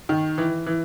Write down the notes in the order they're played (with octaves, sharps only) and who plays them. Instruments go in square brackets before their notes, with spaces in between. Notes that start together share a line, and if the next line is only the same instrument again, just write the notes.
[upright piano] D#3
E3
E3